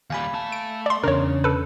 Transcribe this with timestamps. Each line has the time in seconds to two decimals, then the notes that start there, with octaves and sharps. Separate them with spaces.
0.10 D#2 G3 F5 G#5 B5
0.34 A3 A5
0.52 D7
0.86 D5 C6
1.03 E2 C#3 C#4 D4 A#4 C#5
1.44 A4 B4